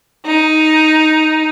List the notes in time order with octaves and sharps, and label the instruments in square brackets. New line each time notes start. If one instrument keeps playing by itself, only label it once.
[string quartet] D#4